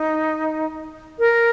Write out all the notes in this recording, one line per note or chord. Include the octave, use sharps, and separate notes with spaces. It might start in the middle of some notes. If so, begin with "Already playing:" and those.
Already playing: D#4
A#4